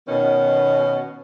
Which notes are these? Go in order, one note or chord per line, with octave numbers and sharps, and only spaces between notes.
B2 D#3 B3 C#4